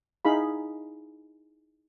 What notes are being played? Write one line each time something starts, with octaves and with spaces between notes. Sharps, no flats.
D#4 E4 G#4 F5 B5